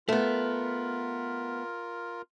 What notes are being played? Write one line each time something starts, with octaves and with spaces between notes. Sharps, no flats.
A3 B3 F4 A#4